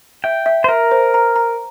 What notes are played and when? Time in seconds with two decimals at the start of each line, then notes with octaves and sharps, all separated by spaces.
0.24 E5 G5
0.46 E5
0.64 C5
0.68 A#4 E5
0.91 C5
1.14 A#5
1.36 A#5